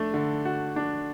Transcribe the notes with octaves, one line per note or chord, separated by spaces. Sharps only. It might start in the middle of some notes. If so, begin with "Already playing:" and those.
Already playing: A3 D4
D3
F#4
D4